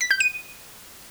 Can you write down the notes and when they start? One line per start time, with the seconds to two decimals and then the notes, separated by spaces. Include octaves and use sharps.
0.01 B6
0.11 G6
0.20 D#7